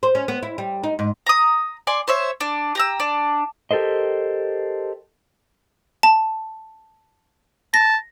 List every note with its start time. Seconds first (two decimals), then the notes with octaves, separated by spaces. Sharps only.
0.03 C5
0.15 C#4
0.28 B3
0.43 E4
0.58 G3
0.84 D#4
0.99 G#2
1.26 A#5 D#6
1.87 D5 G#5 C6
2.08 C5 C#5 E5
2.40 D4
2.75 G4 A#5 E6
3.00 D4
3.71 G4 A4 A#4 C5 D#5
6.03 A5
7.74 A5 A#6